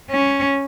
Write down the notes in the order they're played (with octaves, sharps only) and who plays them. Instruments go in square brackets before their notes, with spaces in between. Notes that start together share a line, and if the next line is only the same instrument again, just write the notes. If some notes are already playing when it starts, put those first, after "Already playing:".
[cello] C#4